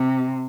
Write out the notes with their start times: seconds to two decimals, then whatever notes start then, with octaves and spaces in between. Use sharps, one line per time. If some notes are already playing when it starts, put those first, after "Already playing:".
Already playing: C3